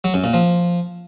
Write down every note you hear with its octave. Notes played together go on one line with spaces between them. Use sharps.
F#3
F#2
A#2
F3